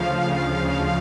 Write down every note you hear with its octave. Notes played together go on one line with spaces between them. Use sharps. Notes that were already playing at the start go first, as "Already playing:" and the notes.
Already playing: D2 C#3 F3 F5
D2
C#3 F3